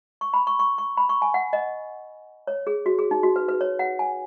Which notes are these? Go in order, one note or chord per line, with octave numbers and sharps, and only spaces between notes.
C#6
B5
C#6
C#6
C#6
B5
C#6
G#5
F#5
D#5
C#5
G#4
F#4
G#4
D#4
F#4
B4
B4
C#5
F#5
G#5